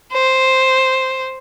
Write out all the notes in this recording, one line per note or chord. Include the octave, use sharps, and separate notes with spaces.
C5